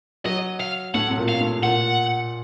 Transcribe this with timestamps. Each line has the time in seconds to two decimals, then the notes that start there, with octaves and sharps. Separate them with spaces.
0.25 F#3 D#5
0.60 F5
0.94 A2 F#5
1.09 C3
1.17 A#2
1.29 F5
1.40 A2
1.63 A#2 F#5